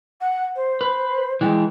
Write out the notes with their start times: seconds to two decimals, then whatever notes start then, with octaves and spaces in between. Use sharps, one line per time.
0.21 F#5
0.55 C5
0.81 B4
1.41 E3 G3 G#3 G5